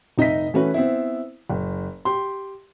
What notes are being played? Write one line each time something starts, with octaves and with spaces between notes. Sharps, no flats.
F1 D#4 D#5 E5 B6
E3 A3 C#4 F#4 B4
B3 C4 E4
F#1
G4 C6